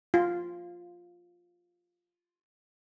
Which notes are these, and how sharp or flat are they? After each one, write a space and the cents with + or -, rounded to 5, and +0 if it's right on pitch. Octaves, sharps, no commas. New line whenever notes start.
F4 +5